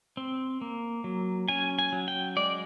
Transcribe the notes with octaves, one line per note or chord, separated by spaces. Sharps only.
C4
A#3
F#3
C#4 G#5
G#5
F#3
G5
G#3 D5